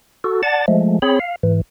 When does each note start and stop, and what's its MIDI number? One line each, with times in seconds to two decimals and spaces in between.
0.24 0.42 66
0.24 0.42 69
0.43 0.66 74
0.43 0.66 78
0.43 0.66 81
0.43 0.66 93
0.68 0.99 53
0.68 0.99 56
0.68 0.99 57
1.02 1.19 60
1.02 1.19 68
1.02 1.19 73
1.02 1.19 83
1.20 1.36 77
1.43 1.61 44
1.43 1.61 52